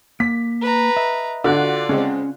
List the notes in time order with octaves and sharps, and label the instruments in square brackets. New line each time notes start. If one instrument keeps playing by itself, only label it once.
[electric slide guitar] A#3 [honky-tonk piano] B6
[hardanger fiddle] B4 A#5
[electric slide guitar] D#5 E5
[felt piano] D3 [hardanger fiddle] F4 D5 [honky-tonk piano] F#4 F#6
[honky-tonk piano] C#3 G#3 C4 [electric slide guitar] C#4